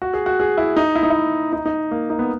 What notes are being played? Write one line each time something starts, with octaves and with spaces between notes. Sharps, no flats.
F#4
G#4
F#4
G#4
E4
D#4
E4
D#4
E4
D#4
D#4
A#3
D#4
B3